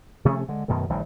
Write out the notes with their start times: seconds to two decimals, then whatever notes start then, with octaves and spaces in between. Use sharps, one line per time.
0.25 C3 F3 A3 C#4
0.49 D3 G#3
0.68 F#2 B2 D#3 A3
0.90 A1 D#3 F3 G3